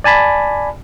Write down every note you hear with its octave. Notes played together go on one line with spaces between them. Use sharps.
D5 G#5 A5 B5